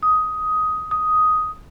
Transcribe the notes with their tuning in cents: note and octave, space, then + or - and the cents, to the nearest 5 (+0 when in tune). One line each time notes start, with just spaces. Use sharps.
D#6 +10
D#6 +5